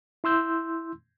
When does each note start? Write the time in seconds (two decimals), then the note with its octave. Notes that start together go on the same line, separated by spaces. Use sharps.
0.24 E4 C6 E6 G6